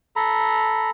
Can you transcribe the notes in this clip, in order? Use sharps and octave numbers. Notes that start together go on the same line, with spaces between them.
A4 A#5 B5